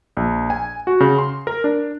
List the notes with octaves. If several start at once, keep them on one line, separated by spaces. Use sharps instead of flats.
A#1
G#5
F#4
C#3
C6
A#4
D4